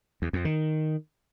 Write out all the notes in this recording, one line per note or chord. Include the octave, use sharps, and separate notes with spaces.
E2
F2
D#3